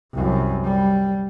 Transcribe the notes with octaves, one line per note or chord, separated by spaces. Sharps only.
C2 F#2
G3